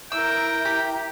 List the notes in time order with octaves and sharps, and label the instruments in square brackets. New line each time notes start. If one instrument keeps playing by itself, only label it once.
[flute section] E4 E5 A#5 [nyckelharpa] A#4 G5 [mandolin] E6
[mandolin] G4